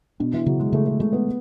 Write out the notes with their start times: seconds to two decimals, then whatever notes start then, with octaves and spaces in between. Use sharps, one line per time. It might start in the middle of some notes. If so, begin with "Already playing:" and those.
0.20 B2 D4
0.33 E3
0.46 C#3 F#3
0.60 G#3
0.73 C#3 A3
0.86 A3
0.99 G#3 A3
1.12 B3